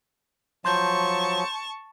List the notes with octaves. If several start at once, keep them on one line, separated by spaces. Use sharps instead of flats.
F3 F#3 A5 C6 C#6 G6